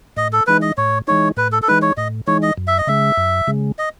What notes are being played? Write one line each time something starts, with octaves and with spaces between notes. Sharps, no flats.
A2 D#5
A4
E3 G#3 D#4 B4
D#5
A2 C#5
E3 G#3 D#4 C#5
A2 B4
A4
A4
E3 G#3 D#4 B4
C#5
A2 D#5
E3 G#3 D#4 C#5
D#5
F#2
E5
D#5
C#3 G#3 E5
F#2
C#3 G#3
D#5